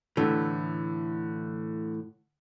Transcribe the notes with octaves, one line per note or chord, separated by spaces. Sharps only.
A2 D3 E3